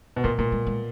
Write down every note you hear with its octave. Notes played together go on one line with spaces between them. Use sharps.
B2
A#2 A#3
A#2 A3
G#3
G#3